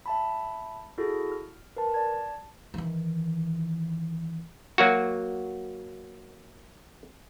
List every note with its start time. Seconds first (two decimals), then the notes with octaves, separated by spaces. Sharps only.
0.06 E5 A5 B5
0.98 E4 F#4 G#4 A4 A#6
1.32 F6
1.76 A#4 B4 A5
1.94 D5 A5 G#6
2.74 D#3 E3
4.78 F#3 A#3 F#4